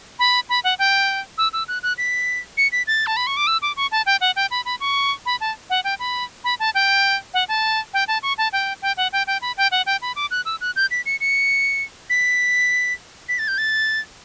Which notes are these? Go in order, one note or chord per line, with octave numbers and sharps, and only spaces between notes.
B5
B5
F#5
G5
E6
E6
F#6
F#6
B6
C#7
B6
A6
A5
B5
C#6
D6
E6
D6
C#6
A5
G5
F#5
G5
B5
B5
C#6
B5
A5
F#5
G5
B5
B5
A5
G5
F#5
A5
G5
A5
C#6
A5
G5
G5
F#5
G5
G5
B5
G5
F#5
G5
B5
D6
F#6
E6
F#6
G6
B6
C#7
C#7
B6
B6
A6
G6
A6